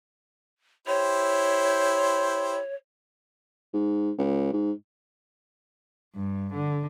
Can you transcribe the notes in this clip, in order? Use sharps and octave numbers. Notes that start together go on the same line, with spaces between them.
E4 G4 C5 C#5
G#2
C#2
G#2
G2
D3